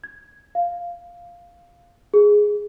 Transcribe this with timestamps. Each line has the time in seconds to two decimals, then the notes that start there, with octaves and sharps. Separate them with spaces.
0.04 G#6
0.55 F5
2.14 G#4